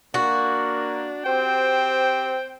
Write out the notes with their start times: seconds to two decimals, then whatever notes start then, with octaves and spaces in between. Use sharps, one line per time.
0.14 A#3 D4 F#4
1.26 C4 G4 C5 G5